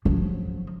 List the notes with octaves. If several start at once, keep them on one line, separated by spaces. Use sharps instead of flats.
F3 F#3